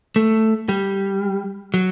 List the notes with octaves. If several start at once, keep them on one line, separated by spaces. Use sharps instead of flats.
A3
G3
F#3